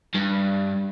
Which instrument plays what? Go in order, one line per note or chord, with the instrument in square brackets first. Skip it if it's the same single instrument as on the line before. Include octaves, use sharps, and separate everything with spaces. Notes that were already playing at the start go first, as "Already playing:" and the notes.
[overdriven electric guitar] G2